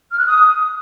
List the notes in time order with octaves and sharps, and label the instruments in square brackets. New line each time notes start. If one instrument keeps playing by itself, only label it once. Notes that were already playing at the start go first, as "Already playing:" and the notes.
[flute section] F6
F#6
D#6